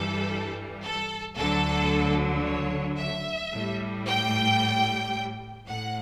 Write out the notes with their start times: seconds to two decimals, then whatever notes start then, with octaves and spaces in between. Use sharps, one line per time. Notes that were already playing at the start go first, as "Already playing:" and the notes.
Already playing: G2 E3 G3 A4
0.83 A4
1.37 D2 D3 F#3 A4
2.44 C#5
2.98 E5
3.53 A2 G3
4.07 G5
5.68 A2 F#5